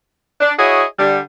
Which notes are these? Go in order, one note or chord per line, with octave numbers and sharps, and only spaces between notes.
D4
E4 F#4 G#4 C#5 D#5
D3 G3